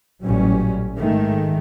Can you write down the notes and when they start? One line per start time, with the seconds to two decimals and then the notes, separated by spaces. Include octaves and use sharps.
0.24 A1 A#2 F#3 G3 C#4
0.98 G#2 D#3 G#3 A3